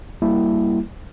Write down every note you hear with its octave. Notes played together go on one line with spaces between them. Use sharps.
G3 A#3 E4